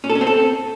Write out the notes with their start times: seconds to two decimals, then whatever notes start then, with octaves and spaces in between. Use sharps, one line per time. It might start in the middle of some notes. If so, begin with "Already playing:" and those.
0.04 C#4
0.10 A4
0.15 C#4
0.21 C4
0.27 A4